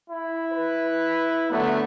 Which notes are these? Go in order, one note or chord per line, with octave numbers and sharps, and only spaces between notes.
E4
B4
D3 F#3 A3 B3